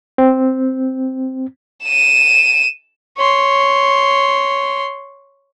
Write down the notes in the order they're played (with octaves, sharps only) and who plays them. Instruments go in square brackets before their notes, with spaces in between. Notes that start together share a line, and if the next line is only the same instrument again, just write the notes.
[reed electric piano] C4
[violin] D#7 E7
[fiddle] C#5 C6